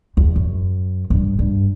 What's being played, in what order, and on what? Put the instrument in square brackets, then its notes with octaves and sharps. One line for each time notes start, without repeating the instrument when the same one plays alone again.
[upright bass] E2
F#2
G2
G2